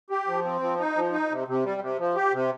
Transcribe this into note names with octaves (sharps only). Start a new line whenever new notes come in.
G4
F3
C4
F3
D#4
F3
D#4
C3
C3
G3
C3
F3
G4
C3